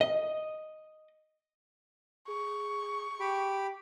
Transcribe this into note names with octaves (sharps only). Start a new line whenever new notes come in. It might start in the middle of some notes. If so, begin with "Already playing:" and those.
D#5
G#4 C#6
G#4
G4 B5 D7